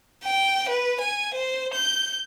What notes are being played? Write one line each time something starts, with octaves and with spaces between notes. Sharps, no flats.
G5
B4
G#5
C5
G6